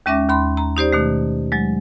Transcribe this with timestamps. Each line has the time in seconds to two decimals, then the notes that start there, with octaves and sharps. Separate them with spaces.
0.06 D#2 G#3 C#4 E5 D6 A#6
0.29 D#2 B5 C6
0.57 A#5
0.77 D#4 G4 C5 D5
0.93 B2 D#3 A3
1.52 F#3 G#3